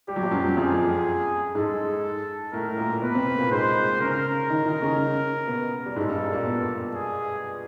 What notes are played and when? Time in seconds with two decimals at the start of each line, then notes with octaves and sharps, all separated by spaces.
0.08 G3 G4
0.16 F#3
0.23 F3
0.31 F#2 F#3
0.57 F2 F3 G#4
1.55 G#2 G#3 A4
2.53 A2 A3 A#4
2.78 A#2 A#3
3.02 B2 B3 B4
3.15 C3 C4
3.38 A#2 A#3
3.51 G#2 G#3 C5
4.00 C#3 C#4 A#4
4.50 D#3 D#4
4.65 D#3 D#4
4.82 C#3 C#4
5.47 B2 B3
5.86 G3
5.96 G#2 G#3 A4
6.08 G2 G3
6.32 A#2 A#3
6.45 B2 B3
6.94 G#4